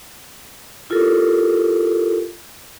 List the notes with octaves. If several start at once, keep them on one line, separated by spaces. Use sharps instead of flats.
E4 F4 G4 A4 A#4